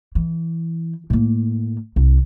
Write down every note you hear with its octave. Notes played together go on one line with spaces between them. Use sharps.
E3
A2 A#3
C2